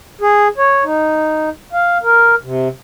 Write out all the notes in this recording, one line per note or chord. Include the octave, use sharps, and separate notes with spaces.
G#4
C#5
D#4
F5
A#4
C3